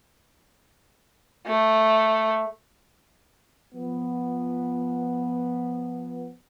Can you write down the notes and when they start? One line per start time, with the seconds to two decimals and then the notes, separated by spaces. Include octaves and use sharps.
1.47 A3
3.74 F3 B3